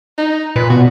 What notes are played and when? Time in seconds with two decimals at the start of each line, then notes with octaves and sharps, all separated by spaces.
0.18 D#4
0.56 A#2 B4
0.70 B2 F#4